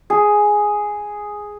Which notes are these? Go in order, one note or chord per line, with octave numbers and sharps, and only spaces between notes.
G#4